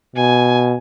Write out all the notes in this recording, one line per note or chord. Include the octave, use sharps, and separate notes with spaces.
B2 G#5